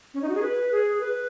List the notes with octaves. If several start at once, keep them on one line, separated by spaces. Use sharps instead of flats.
C#4
D#4
F#4
G#4
B4
G#4
B4